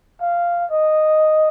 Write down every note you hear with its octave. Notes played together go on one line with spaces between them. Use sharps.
F5
D#5